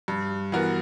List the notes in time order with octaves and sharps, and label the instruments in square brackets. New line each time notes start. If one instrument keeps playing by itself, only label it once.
[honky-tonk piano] G2
E3 B3 F#4 A#4